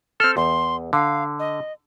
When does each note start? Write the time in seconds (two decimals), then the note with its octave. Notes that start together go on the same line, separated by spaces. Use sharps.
0.20 C4 A4 F6
0.37 E2 C6
0.93 D3 F5
1.39 D#5